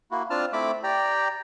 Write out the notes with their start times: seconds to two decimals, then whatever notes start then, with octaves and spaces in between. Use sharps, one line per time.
0.11 A#3 E4 F#4
0.30 C4 D4 F4 A5 F6
0.53 A3 C4 E4 B5 D6
0.83 G4 D5 G5 A#5